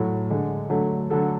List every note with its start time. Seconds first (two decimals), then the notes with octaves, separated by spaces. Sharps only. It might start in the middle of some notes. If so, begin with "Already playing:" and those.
Already playing: A2 F#3 A3
0.30 D3 G#3
0.70 D3 F#3 A3
1.10 D3 F#3 A3 A4